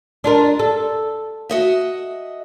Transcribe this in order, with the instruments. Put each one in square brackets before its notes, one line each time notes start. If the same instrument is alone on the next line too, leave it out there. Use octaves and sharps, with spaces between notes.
[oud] D4 F4 A#4
A4
[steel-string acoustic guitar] F#4 D#5 E5